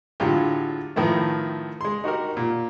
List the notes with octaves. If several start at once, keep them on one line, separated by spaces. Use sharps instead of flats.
A2 D3 F#3 G#3 F4 G4
A2 D#3 F3 A3 B3
G#3 C6
D#4 F#4 G4 A#4
A#2